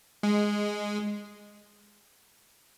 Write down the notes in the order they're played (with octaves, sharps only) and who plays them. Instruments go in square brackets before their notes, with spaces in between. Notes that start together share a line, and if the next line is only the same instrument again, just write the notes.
[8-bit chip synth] G#3